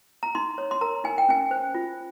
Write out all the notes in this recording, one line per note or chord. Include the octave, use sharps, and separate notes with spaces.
A#5
D#4 C6
C#5
C6
A#4 A#5
D#4 G#5
G5
C#4 G#5
C5
F4